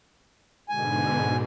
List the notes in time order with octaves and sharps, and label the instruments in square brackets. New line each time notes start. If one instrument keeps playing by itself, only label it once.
[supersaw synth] G#2 B2 D3 [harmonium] G#5